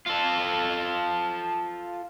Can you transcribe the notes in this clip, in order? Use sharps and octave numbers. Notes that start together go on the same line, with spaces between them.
F4 A4